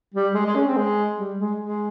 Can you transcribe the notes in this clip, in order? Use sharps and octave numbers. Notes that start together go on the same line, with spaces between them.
G3
G#3
G#3
C#4
C4
G#3
G3
G#3
G#3